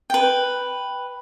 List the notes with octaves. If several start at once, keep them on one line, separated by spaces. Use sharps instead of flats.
B4 G5